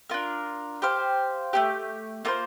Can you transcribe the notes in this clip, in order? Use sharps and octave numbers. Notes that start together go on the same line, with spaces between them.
D4 F4 A#4
G4 C5 F5
A3 C4 G4
A#3 F4 A4 C5